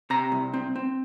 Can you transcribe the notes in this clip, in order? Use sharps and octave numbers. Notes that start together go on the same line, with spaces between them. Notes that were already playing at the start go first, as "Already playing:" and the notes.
C3 A#5
C2
C4
C4